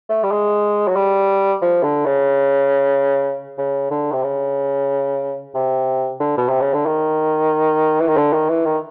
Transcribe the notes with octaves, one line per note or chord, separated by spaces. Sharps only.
A3
G3
G#3
F#3
G3
F3
D3
C#3
C#3
D3
C3
C#3
C3
D3
B2
C3
C#3
D3
D#3
E3
D#3
D3
D#3
E3
D#3